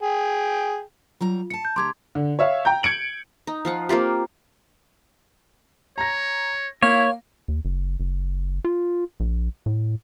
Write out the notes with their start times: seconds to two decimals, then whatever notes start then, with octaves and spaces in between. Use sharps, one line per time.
0.02 G#4 G5
1.21 F#3 G3 F4 A#5
1.50 E4 A5 C#7
1.65 G6
1.76 D2 G4 A#5 C6 D6 G#6
2.15 D3
2.39 C#5 E5 F5
2.65 G5 A#5 G6
2.83 G#6 C#7 D7 F#7
3.47 D#4
3.65 F3 F4 F#5
3.89 A#3 C4 F4 G4
5.98 C#5 A#5 A#6
6.83 A#3 E4 C#5 F5
7.48 D#2
7.65 F#1
8.00 F#1
8.65 F4
9.20 A#1
9.66 A2